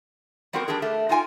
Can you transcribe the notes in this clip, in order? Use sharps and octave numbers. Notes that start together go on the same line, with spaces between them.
G3 B3 C4 F#4 A#4 G5
G3 D4 G4 G#4 A#4
A3
D#4 F4 G5 G#5